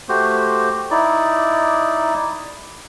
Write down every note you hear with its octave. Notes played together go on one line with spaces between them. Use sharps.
A3 F#4 G4 C5
D#4 E4 D5